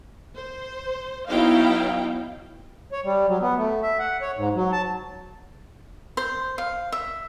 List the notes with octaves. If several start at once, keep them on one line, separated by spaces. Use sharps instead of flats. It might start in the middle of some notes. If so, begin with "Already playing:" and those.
C5
F#3 B3 D#4 E4 F5 G5
C#5
G3
F#3
B3
A3
E5
F#5
C#5
G#2
F#3
A5
C5
F5
E5